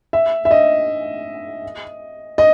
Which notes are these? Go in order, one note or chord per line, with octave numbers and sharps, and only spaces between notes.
E5
E5
D#5
D#5